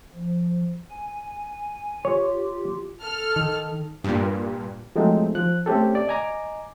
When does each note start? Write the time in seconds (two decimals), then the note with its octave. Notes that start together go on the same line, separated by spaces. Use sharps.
0.14 F3
0.90 G#5
2.05 F4 G4 C#5
3.03 A4 F6
3.36 D#3
4.04 G2 A#2
4.96 F3 F#3 G#3 A3 C4 D#4
5.35 F3 F#6
5.66 A3 C4 C#4 G4 A4
5.95 D5
6.08 D#5 G#5 A#5 D6